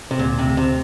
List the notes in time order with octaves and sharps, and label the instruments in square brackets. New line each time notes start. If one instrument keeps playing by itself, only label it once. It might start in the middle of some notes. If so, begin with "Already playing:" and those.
[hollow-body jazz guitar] C3
[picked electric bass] D2 [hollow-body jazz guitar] A#2
[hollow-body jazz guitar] C3
[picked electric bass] D2
[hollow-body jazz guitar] C3